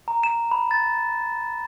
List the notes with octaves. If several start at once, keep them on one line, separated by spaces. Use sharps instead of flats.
A#5
E7
B5
A6